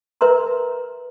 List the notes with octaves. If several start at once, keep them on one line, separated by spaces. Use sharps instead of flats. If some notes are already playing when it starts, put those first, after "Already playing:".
A#4 B4 E5 A#5 C6